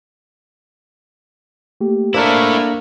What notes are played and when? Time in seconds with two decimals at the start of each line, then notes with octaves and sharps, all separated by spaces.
1.81 A3 A#3 G4
2.14 A3 A#3 D4 E4 A#4 C5